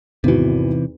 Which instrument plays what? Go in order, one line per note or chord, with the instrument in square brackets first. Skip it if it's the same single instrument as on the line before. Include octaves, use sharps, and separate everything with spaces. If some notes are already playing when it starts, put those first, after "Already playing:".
[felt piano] G#1 E2 F#4 [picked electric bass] C3 E3